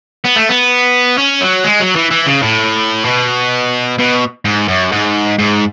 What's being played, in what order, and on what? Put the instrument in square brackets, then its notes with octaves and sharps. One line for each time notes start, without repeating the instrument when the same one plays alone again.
[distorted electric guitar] B3
A3
B3
C#4
F#3
G#3
F#3
E3
E3
C#3
A2
B2
B2
G#2
F#2
G#2
G#2